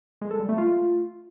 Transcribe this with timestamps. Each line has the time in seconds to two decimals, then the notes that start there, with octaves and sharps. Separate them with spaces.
0.21 G#3
0.31 A4
0.40 G3
0.49 A3
0.58 F4